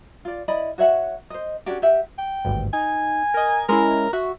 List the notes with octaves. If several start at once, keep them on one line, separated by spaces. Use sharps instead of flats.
F4 D5
E4 D5 D#5 B5
F#4 C#5 E5 F#5
C5 D#5
C#4 D4 F#4 G4
G4 E5 F#5
G5
G#1 D2 G2
D#4 G#5
A#4 D#5
G#3 C#4 E4 A#4
F#4 E5